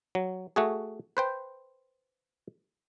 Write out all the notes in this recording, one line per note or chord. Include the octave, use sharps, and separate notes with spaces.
F#3
A3 F#4 G#4
B4 C5 G5